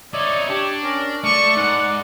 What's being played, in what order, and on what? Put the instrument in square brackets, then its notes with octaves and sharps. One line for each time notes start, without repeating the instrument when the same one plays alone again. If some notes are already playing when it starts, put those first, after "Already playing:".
[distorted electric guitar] D#4 E4 [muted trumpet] C#5 [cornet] D5
[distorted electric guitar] D4 [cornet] G4
[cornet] C#4 [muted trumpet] A#4
[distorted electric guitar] A3 [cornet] D5 [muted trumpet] C#6
[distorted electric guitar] G#2 [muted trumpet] F#5